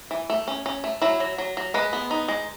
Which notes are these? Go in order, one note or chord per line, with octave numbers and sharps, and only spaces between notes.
E3
A3
C#4
C#4
A3
F#3 E4
F#3
F#3
F#3
G#3 B4
B3
D#4
G#3